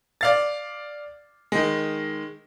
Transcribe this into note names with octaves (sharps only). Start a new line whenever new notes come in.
D5 F5 A6
D#3 G#3